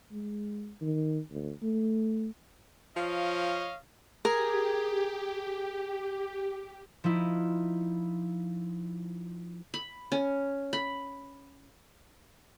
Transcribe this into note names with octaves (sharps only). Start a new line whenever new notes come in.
G#3
D#3
D2
A3
F3 C#5 D#5 F5
G4 G#4 A#4
F3 D#4 E4
B5
C#4
B5